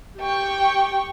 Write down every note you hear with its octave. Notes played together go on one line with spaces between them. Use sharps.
G4 G5 C#6